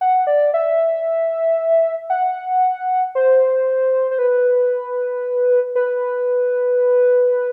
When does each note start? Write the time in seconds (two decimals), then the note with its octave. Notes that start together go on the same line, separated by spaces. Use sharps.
0.01 F#5
0.27 D5
0.54 E5
2.10 F#5
3.15 C5
4.11 C5
4.19 B4
5.75 B4